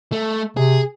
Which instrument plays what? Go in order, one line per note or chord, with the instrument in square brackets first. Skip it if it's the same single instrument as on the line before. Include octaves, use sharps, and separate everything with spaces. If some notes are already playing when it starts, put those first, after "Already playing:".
[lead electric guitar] A3
[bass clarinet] C3 [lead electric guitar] G#4